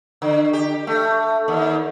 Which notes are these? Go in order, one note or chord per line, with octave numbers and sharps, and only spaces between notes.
D3
G4
A3
D#2